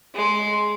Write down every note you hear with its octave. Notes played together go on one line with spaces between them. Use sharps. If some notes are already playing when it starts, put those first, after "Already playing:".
G#3